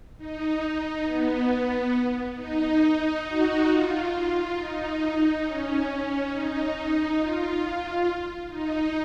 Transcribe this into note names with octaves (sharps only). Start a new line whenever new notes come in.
D#4
B3
D#4
F#4
F4
D#4
C#4
D#4
F4
D#4